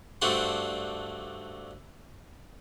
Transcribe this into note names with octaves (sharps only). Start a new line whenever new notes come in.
G2 A3 C4 D4 F#4 C6